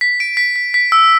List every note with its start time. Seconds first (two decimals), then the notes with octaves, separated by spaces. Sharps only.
0.01 B6
0.20 D7
0.37 B6
0.56 B6
0.74 B6
0.92 E6